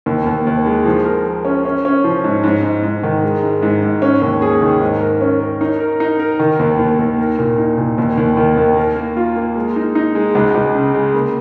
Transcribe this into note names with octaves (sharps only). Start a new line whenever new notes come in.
D#2
D#2
D#2
G#3
F3
A#4
A#4
C#4
C#4
C#4
F3
G#2
G#2
G#2
G#2
D#3
G#3
G#2
G#2
G#2
C#4
D#2
G#4
D#3
G#2
A#4
C#4
A#4
D#4
A#4
D#4
A#4
D#3
D#2
D#2
D#2
A#4
A#2
D#4
A#2
D#2
D#2
D#3
D#2
A#4
A#3
F4
A#3
G#3
D#4
D#4
G#3
C#2
C#2
C#3
G#3
A#3